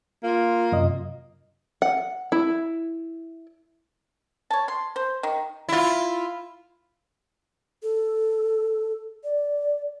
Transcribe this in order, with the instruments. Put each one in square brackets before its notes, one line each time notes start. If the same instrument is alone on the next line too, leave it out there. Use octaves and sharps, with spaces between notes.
[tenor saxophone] A#3 [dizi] F4
[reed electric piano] F#2 C3 D#5
[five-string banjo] F#5
E4
[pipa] C#5 A5
C6
C5
D#3
[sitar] E4 F4
[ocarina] A4
D5